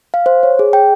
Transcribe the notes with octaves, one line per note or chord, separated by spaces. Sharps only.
F5
C5
C#5
G#4
G5